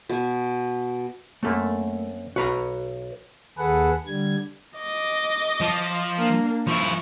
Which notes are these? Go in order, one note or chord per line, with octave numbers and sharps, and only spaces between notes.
B2 G#5
F#2 A3 A#3 C4 A4
B1 F#4 B4 A#5
D#2 G#4 A4 B4 F#5
D3 G3 G#6
D#5 D6
F3
A#3 D4
F3 E4 C#6